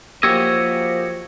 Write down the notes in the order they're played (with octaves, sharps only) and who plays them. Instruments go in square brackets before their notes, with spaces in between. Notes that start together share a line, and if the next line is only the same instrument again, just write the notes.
[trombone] F3 [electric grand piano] A#3 G4 [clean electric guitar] F#4 C#5 D#5 [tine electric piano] E6 G#6